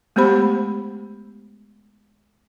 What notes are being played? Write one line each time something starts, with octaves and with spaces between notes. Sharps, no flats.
G#3 A3 B3 G4 C5 B5